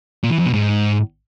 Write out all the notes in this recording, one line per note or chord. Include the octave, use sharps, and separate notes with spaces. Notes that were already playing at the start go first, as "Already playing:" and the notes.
A#2
E3
F2
B2
G#2